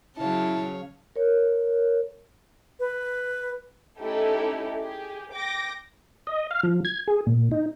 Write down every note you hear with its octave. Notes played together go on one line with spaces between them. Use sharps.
C#3 F#3 E4 C#5 F5 A5
A#4 C#5
B4
A3 C#4 D#4 E4 G4 A4
G4 G#4
G5 D6 A#6
D#5
F5
F3
G#6
G#4
A#2
D#4